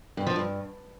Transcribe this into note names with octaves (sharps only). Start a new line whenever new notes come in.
G2
F3
G2